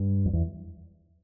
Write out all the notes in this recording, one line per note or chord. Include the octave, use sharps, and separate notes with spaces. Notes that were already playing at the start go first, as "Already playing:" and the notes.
Already playing: G2
F2
E2